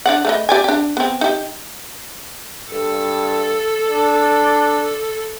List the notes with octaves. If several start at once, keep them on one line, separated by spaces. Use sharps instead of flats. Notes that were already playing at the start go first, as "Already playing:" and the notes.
D4 D5 F#5
A3 B4 D#5
G4 D5 G#5
D4 G4
B3 C4
D#4 G4
G2 A4
D4